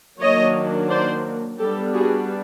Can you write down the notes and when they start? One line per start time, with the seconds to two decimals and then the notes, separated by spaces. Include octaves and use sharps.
0.20 D#3 F#3 A#3 D4 C#5 D#5
0.90 C5 D5
1.59 G3 B3 D4 G4 A4
1.94 F#4 G#4